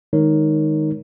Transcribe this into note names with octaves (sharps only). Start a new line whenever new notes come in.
D#3 G#3 D#4 A#4 C#5